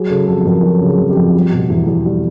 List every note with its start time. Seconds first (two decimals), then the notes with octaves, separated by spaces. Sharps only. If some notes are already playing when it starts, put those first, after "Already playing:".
Already playing: F#3 G#4
0.10 C#3 A4
0.28 F2 A4
0.46 F2 A#4
0.63 F#3 A4
0.81 C#3
0.87 G#4
0.99 F2
1.10 G4
1.17 F2
1.35 G3
1.52 B2
1.70 E2
1.87 E2
2.05 G3